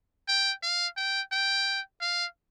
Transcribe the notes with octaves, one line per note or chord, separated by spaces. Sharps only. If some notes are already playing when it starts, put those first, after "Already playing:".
G5
F5
G5
G5
F5